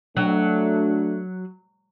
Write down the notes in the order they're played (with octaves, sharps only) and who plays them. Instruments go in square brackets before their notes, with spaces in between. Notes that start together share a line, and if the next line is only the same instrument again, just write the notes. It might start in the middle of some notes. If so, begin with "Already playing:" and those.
[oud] F#3 [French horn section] A3 D4